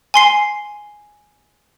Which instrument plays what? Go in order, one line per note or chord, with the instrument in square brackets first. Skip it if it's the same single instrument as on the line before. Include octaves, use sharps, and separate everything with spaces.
[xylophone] G#5 C6 C7